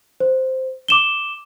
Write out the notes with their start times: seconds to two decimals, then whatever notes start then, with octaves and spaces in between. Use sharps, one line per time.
0.20 C5
0.88 D6 E7 G7